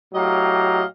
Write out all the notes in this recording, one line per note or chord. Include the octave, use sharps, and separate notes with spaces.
A2 F#3 G4 D#5 F5 A#5